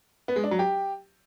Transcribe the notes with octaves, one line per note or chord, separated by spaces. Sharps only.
B3
G#3
D4
F#3
G4